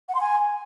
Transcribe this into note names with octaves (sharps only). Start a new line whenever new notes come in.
F#5
C6
G#5